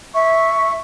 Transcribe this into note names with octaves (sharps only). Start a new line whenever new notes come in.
E5 C#6